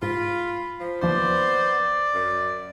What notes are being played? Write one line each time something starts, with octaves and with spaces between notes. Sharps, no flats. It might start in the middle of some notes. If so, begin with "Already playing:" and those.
G#2 F4 B5
F3
D#2 F3 B3 C5 D5
F#2